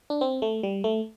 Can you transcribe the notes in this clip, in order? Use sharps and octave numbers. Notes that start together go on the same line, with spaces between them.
D4
C4
A3
G3
A3